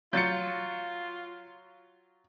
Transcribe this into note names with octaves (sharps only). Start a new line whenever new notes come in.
F#3 F4 G6 A6 C#7